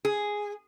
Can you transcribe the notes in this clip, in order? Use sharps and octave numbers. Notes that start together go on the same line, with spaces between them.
G#4